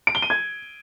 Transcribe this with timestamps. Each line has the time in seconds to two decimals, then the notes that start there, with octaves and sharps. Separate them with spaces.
0.07 D7
0.15 G7
0.22 D#7
0.30 G#6